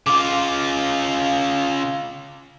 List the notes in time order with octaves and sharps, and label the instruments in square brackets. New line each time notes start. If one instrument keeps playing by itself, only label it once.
[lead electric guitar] C#3 F4 [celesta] D6